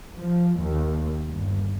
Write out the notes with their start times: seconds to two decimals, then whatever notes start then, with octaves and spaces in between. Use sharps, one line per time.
0.16 F3
0.60 D#2
1.31 G1